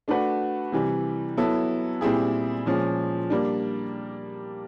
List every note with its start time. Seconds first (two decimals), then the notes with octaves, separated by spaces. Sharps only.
0.08 A3 D4 F#4 B4
0.72 C3 E3 G3
1.37 F#3 B3 E4 A4
2.01 A#2 G3 C4 E4 G#4
2.66 A#2 F3 G#3 C#4
3.30 G3 A#3 D4